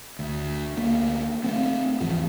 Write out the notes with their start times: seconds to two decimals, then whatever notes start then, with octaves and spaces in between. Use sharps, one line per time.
0.19 D2
0.76 D2 A#3
1.44 A3 B3 C4
2.00 G#1 D#2 E3 F3